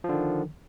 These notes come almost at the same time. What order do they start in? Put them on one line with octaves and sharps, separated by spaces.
F3 D3 D#3